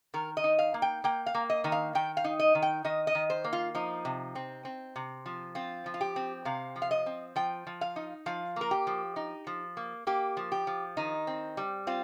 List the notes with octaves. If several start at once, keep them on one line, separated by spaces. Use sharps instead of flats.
D#3 A#4
D#5
D#4
F5
A#3
G5
A#3 G5
F5
A#3
D#5
D#3 D#5
F5
D#3 G5
F5
D#4
D#5
D#3
G5
D#3 D#5
D#5
D#3
C5
A#3
F4
F3 D#4
C3
C4
C4
C3
F3
C4 F4
F3
F4
G4
C4
C3 F5
F3
F5
D#5
C4
F3 G5
F3
F5
D#4
F3 F5
A#3 A#4
G4
F3
D#4
F3
A#3
A#3 G4
F3
G4
F3
D#3 D#4
C4
G3
C4 F4